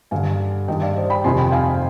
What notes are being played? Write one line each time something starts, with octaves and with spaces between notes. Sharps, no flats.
G2 D3 F5 G#5
G2 D#3 D#5 G5
D5 F5
C5 D#5
G5 B5
F2 C3 D#3 G#5 C6
G5 B5
F5 G#5